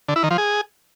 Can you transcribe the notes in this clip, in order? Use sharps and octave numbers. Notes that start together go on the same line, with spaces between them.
D3
E4
D#3
F3
G#4